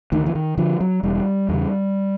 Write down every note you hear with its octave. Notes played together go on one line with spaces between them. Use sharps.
D2 D#3
E3
D#3
D3 F3
F#3
E1 G3
E2 C#3